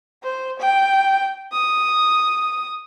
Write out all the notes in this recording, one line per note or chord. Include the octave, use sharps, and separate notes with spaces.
C5
G5
D#6